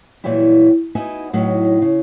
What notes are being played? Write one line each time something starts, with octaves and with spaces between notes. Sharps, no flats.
A#2 E3 F#3 G3 E4
B3 D#4 E4 F#4 G#5
A2 F#3 B3 D#4
C#3